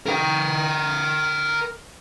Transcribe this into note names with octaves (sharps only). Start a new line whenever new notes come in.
A#4 G5